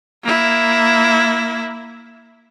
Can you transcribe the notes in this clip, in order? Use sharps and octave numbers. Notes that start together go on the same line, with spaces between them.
A#3 E4